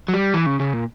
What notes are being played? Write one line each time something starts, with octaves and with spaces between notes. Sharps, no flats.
F#3
G3
E3
C#3
C#3
A#2